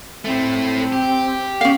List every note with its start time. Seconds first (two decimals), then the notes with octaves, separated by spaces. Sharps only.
0.25 A2 A3 C4
0.92 G4
1.61 C#4 F5